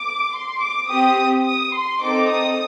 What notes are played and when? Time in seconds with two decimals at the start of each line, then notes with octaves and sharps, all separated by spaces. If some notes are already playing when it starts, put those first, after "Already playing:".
Already playing: D6
0.32 C6
0.61 D6
0.89 C4 G4 D#6
1.45 D#6
1.74 C6
2.02 C4 D#4 A4 D6
2.31 D#6